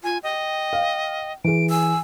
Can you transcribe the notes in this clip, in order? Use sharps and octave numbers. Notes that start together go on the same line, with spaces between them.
F4 G#5
D#5 G5
F5
E3 G#4 D7
G#5 E6